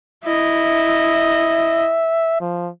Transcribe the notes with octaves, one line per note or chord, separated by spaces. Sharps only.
E4 D#5 E5
F3